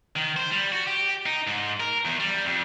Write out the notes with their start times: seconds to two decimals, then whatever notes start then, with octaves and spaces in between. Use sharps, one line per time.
0.16 D#3
0.36 C5
0.51 G3
0.72 F#4
0.87 G4
1.26 D#4
1.47 G#2
1.80 A#4
2.05 E2
2.20 G3
2.45 F2